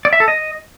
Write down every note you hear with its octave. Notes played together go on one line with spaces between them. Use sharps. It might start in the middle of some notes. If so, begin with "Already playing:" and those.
D5
E5
A4
D#5